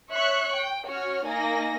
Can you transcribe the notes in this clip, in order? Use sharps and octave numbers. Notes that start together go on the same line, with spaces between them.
C#5 E5 C#6 F#6
G5
C#4 F#4 C#5 F6
A#3 D#4 G#5 A#6